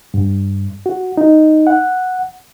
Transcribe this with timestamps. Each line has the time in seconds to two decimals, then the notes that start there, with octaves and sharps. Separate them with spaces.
0.14 G2
0.86 F#4
1.17 D#4
1.67 F#5